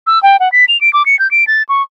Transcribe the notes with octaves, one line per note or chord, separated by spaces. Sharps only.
E6
G5
F#5
B6
F7
D7
D6
C#7
G6
D7
A6
C#6